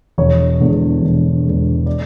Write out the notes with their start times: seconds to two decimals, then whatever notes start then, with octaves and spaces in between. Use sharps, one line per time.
0.18 E1 C#5
0.60 E2 D3 G#3
1.02 E1
1.45 E2 D3 G#3
1.86 D5